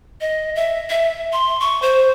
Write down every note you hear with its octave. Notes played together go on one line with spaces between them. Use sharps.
D#5
E5
E5
C6
C#6
C5